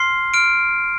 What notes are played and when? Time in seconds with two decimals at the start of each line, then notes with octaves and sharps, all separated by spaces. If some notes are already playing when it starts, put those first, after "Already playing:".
Already playing: C6 F6 C7
0.34 F6 D7